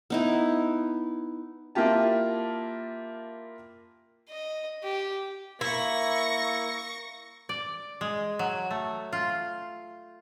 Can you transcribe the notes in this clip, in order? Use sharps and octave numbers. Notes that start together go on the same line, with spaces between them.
B3 D#4 E4
A#3 E4 F4 G4 A5
D#5
G4
A#3 E4 C#6 A#6
D5
G#3
F#3
A3
F4